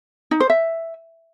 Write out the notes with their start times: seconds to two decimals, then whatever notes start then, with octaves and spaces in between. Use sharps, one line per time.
0.31 D#4
0.40 C5
0.50 E5